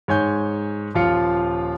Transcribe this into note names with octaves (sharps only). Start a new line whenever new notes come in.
G#2 C#5 G#5 G6
D#1 F3 F4 F5 C#7